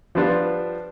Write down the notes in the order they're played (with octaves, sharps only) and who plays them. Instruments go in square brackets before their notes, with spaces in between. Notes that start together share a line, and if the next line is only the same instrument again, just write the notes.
[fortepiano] F3 G3 B3 D4 F4